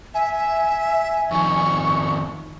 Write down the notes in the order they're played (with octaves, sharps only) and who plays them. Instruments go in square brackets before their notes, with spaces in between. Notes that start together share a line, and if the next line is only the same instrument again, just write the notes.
[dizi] E5 [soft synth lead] G#5
[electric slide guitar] F2 D#3 F3 [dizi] C#6